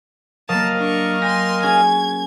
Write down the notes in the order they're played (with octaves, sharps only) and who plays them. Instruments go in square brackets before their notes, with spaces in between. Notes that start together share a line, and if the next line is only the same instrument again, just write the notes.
[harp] F#3 A#3 [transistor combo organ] A#4 D#5 F5 [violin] A5
[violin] D4 C#6
[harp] G5 A#6 [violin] G#5 C6
[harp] C#4 F#4 G#4 [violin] G#6